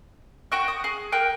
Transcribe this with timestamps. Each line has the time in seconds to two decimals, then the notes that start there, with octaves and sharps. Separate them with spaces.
0.52 F#4 G5 C#6 F#6
0.68 D#6
0.84 G#4
1.12 A#4 G5 F#6